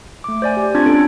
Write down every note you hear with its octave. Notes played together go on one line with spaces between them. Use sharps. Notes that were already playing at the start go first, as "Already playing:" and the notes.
A3 D6
C5 D5 G#5
G4
C4 D4 F4 G#6 A6
C4 C#4 A4 A6 D7